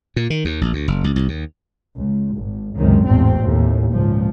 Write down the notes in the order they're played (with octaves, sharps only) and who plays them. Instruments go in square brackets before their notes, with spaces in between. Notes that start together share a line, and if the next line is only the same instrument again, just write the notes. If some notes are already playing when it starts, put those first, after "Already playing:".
[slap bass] A#2
D#3
D#2
A#1
D2
F#1
C#2
C2
D#2
[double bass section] C#2
G#1
C#2 F#2 A2 C3 D#3
A1 E2 G#2 B2 C4
D#2 A2
G#1 C#2 A#2 F3